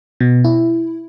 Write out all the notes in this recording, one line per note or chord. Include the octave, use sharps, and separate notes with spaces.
B2
E4